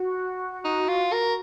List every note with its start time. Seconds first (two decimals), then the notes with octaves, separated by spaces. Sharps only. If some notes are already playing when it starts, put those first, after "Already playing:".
Already playing: F#4
0.64 D#4
0.88 F4
1.13 A#4